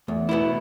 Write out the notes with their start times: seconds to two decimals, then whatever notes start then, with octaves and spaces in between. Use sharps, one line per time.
0.08 E2 A3
0.29 B2 B3 E4